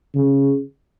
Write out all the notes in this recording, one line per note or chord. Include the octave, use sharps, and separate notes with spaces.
C#3